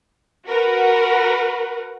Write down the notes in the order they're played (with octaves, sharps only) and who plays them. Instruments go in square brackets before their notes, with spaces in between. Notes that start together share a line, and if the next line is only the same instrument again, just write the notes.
[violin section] F#4 A#4 B4